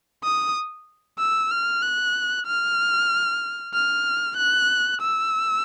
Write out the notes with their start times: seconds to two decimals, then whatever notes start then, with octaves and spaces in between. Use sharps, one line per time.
0.24 D#6
1.19 E6
1.51 F6
1.82 F#6
2.46 F6
3.74 F6
4.37 F#6
5.02 E6